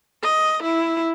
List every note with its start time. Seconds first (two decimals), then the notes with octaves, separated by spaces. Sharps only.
0.23 D#5
0.63 E4